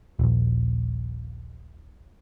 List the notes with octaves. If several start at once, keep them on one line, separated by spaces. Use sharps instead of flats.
D#1 A#1